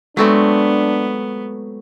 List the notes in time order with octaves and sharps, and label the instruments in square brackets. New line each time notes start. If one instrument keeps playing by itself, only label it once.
[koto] F#3 A3 C4 [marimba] G#3 [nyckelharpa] B3 [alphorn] D4